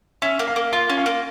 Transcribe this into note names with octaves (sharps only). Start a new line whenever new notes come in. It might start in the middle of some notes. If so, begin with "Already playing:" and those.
C#4 E5
A#3
F5
A#3
F4 F5
C#4
F5
A#3